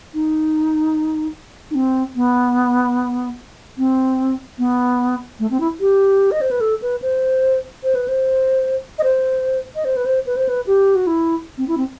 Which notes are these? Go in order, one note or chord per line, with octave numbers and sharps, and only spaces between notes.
D#4
D#4
C4
B3
C4
B3
A3
C4
E4
G4
D#5
C5
B4
A4
B4
C5
C5
B4
C5
D#5
C5
D#5
C5
B4
C5
B4
C5
B4
G4
F#4
E4
C4
E4
C4